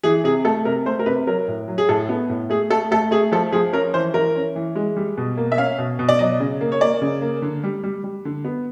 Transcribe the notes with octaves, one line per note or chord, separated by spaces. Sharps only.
E3 G#4
C3 G#4
A3 A4
C3 A#4
A3 C5
A#4
C3 B4
F#3 A#4
A2
F#3
G#4
A2 A4
B3
A2
A3 G#4
A3 A4
A3 A4
A3 G#4
F3 A4
F3 G#4
C#4 A#4
E3 C5
E3 A#4
C#4
E3
G#3
G3
B2
A#3
E5
C#4 F5
B2
B2
D5
F#3 D#5
C#3
A#3
C#5
A#3 D5
C#3
A#3
D3
G3
G3
G3
D3
B3